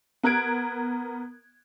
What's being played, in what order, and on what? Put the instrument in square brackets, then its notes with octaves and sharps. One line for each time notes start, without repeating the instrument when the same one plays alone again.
[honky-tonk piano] B3 A#4 F#6 G#6 D7